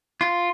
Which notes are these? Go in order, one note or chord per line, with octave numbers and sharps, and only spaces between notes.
F4